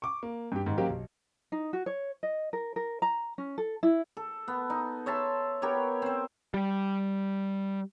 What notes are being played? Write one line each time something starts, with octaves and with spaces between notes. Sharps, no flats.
C#6 D6
A#3
G2 G4
G#2 D#3
F#3 A#3 C#4 G4 C5 F5
B1
D#4
F#4
C#5
D#5
A#4
A#4
A#5
C#4
A4
E4
A4
B3
D#4
C#5 E5 A5 C6
B3 G4 A#4 C#5
C4 C5
G3